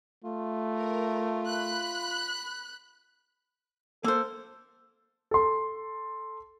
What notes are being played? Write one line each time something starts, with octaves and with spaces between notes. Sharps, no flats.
A3 F4
A#4
B5 F#6
A#3 A4 C5
A4 C6